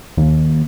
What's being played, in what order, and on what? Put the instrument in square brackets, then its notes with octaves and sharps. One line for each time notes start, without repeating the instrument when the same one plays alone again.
[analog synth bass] D#2